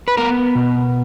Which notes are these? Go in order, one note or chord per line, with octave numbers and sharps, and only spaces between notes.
B4
B3 A#4
B2